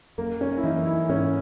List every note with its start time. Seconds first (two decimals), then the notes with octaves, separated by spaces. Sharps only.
0.18 F#2 A#3
0.41 C#4
0.57 E4
0.64 E3 D#4
0.87 E4
1.09 G#2 C#4